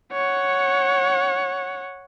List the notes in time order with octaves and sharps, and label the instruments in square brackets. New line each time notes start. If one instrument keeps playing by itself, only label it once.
[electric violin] C#5 F#5